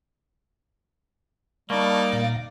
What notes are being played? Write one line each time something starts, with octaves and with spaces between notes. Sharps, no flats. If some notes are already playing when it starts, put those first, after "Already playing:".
G3 A#3 D#4 D5 A5 B5 C#6
A#2 F5 A#6